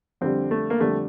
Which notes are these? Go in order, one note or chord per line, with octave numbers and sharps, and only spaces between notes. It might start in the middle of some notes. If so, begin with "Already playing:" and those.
F2 D3 G3 C4
A3
A#3
F2 D3 G3 A3